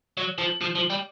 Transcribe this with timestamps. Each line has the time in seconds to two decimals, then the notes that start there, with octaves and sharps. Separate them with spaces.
0.18 F#3
0.38 F3
0.61 F3
0.75 F3
0.90 G3